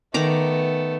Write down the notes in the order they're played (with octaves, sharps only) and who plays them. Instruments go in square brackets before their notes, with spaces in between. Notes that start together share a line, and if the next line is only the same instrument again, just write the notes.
[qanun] D#3 A#5 D6 [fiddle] A3 B3